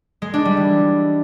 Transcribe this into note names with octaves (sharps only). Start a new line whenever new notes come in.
G#3
D4
G3
E3